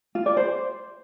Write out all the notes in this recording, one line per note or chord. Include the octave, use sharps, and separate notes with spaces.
F4
D5
C5